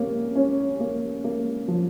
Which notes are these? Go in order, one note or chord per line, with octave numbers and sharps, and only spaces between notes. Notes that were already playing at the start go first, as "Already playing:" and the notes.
Already playing: C3 A#3 C#4
C#4
A#3
A#3
F3